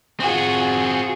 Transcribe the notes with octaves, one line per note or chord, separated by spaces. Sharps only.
C4 F4 F#4 G#4